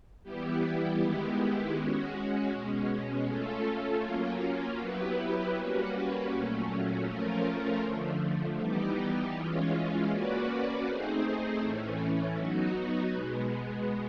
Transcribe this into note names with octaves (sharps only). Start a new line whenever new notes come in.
E3 G3 B3 E4 G4
D#3 G#3 B3 E4 G4
G#3 C#4 F#4
B2 G#3 C#4
A3 C#4 F4 A4
F#3 A#3 C#4 F4
F#3 B3 E4 G4 B4
G3 A#3 C#4 F#4 B4
A#2 F#3 A3 C#4
F3 A3 C#4 F4 A#4
D3 F3 A3
E3 G3 B3 D#4 G4
E3 G#3 C#4 F4
A#3 C#4 F#4 B4 D5
A3 C4 D#4 G#4 C5
A2 E3 A3 C#4
F#3 B3 D#4 F#4
B2 G#3 B3